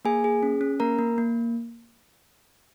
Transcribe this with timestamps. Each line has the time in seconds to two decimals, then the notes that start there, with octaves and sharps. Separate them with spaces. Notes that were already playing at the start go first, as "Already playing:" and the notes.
0.05 A#3 G#4 G#5
0.24 G#4
0.43 C#4
0.61 C#4
0.80 A#3 A#4 A#5
0.99 A#3
1.18 A#3